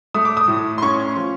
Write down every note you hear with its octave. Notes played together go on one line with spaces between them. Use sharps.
A3 D#6
D6
D#6
A2
C6
C#4 C#6
C6
F3